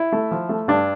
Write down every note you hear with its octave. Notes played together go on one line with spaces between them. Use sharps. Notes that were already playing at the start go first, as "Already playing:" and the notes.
Already playing: E4
A3
F3
A3
G2 D4